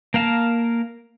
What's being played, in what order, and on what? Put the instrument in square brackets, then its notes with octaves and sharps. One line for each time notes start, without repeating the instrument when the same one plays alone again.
[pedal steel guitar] A#3 A#4 F5 A5